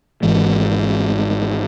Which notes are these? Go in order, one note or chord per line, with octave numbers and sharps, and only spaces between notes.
G#1 G#2 E3 G#3